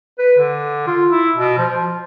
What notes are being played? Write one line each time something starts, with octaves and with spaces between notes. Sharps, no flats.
B4
D3
F4
E4
B2
F3
F3